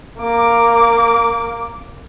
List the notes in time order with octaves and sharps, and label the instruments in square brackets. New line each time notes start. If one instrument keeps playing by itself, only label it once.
[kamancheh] A#3 D6